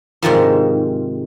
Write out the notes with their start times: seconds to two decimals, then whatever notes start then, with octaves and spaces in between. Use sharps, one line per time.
0.22 G#2 C3 D#3 F3